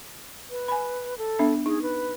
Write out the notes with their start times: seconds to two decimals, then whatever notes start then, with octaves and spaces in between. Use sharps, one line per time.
0.50 B4
0.68 G#5 B5
1.18 A4
1.39 B3 D4 E5
1.66 D#4 G#4
1.82 B4